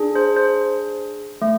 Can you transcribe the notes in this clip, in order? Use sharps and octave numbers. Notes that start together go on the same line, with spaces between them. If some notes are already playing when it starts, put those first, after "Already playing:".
Already playing: D4 G#4
C5
C5
A3